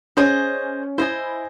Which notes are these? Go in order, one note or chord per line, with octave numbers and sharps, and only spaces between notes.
C#4 G#4 C5 D#5
E4 C5 D#5 G#5